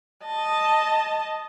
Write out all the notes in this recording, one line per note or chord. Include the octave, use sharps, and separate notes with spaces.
D#5 A5